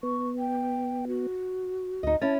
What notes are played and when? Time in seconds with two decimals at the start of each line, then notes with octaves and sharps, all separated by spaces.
0.03 B3 C#6
0.38 G5
1.08 F#4
2.03 D2 D#4 D#5
2.21 C#4 E4 A5